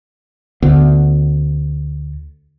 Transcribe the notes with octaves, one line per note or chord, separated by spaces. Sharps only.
D2 B3